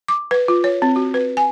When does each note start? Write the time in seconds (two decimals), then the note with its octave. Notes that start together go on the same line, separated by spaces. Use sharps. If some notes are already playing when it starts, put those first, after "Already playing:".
0.08 D6
0.31 B4
0.48 F4
0.64 C#5
0.82 C4
0.96 F#4
1.14 B4
1.37 G#5